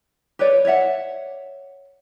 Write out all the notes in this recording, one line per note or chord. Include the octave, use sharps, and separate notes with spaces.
G4 B4 C#5 D5
C#5 D5 E5 F#5